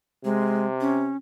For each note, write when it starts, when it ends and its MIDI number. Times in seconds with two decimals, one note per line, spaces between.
0.25 1.13 48
0.25 0.67 56
0.81 1.17 61